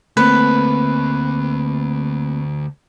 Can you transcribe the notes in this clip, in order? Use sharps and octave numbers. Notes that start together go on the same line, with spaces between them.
D2 A3 A#3 C4 B4